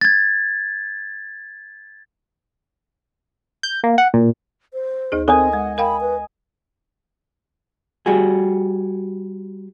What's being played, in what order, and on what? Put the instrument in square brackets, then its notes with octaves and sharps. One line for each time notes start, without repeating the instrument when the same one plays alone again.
[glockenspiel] G#6 A6
[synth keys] G6
A#3
F#5
A#2
[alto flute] C5
[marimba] D2 D#4 G#4
[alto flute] C4 [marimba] A4 A#4 [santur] D#5 G#5
[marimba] G#3 [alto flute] F#5
[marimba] A#4 F5 G5 [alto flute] B5
[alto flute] B4
[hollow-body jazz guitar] G3 F#4 G#4